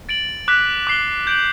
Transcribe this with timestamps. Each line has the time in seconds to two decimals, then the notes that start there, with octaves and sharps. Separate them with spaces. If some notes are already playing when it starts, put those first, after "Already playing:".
0.09 A6 D7 F#7
0.48 D6 F#6 B6
0.87 D6 F#6 C7 G7
1.27 G6 D7 F#7